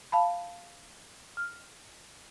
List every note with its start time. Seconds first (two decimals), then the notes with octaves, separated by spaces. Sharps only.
0.12 F5 A5 B5
1.37 F6